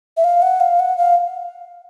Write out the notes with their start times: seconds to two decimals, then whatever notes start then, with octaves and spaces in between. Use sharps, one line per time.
0.17 E5
0.24 F5
0.42 F#5
0.60 F5
0.80 F#5
0.98 F5